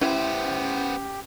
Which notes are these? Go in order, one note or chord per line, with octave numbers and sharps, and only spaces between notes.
B3 C#4 E4 G4 C5 E5